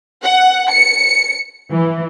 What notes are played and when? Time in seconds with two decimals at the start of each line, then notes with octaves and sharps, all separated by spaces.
0.24 F#5
0.71 C#7
1.71 E3